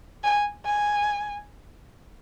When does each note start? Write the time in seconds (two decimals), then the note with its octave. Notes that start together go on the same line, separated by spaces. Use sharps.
0.24 G#5
0.65 G#5